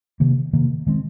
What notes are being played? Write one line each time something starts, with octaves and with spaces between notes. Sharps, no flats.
C3 D#3 A#3
C3 D#3 A#3
D#3 G#3 C4